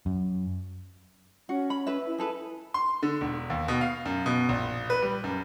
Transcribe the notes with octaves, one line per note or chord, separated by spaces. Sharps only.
F#2
C#4 F#4
B5
B4 E5
E4
G#4 A4 B4
C6
D3
E1
D#2
B2
F5
F#2
B2
A#1
B4
G3
F#2